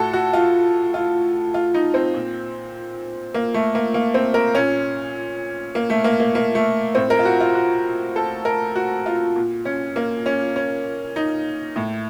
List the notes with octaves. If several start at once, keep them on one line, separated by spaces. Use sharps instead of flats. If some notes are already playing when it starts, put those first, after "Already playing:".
Already playing: A2 F#4 A4
F#4
F4
F4
F4
D#4
C4
A#2
A#3
A3
A#3
A#3
C4
A#4
A#2 C#4
A#3
A3
A#3
A#3
A#3
A3
A2 C4
A#4
F4
F#4
F4
F#4
A4
A#4
F#4
F4
A#2
C#4
A#3
C#4
C#4
D#4
A2